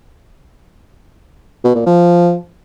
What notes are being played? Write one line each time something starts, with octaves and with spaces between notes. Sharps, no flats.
B2
A#2
F3